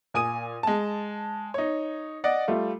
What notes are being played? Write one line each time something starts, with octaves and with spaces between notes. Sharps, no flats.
A#2 G#5 D#6 D#7
G#3 A5
D#4 C#5
D5 D#5 F#5
G3 A3 F4